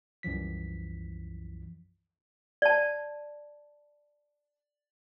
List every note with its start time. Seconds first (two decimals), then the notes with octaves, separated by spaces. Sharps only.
0.23 C2 F#2 E3 F3 B6
2.62 D5 A5